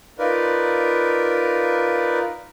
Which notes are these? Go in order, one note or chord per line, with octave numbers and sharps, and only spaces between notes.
D#4 F4 A#4 B4 D5